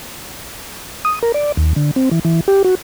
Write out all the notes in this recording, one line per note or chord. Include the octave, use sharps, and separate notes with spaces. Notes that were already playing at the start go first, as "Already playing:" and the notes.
D#6
A#4
D5
D#2
D3
C4
E3
E3
G4
F#4